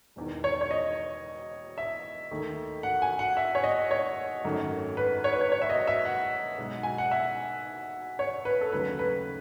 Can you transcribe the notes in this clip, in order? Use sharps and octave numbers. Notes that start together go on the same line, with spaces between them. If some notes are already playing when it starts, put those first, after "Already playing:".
E1 E2 D#3
C#5
C#5
D#5
E5
D#2 D#3 A3
F#5
G#5
F#5
E5
C#5
D#5
C#5
G#1 F#2 D#3 A3
B4
C#5
B4
C#5
C#5
E5
D#5
E5
F#5
B1 B2 G#3
G#5
F#5
E5
C#5
B4
A4
D#2 C#3 F#3 A3 B4
B4